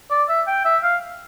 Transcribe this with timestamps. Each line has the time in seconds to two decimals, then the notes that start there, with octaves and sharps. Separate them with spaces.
0.11 D5
0.29 E5
0.47 G5
0.65 E5
0.83 F5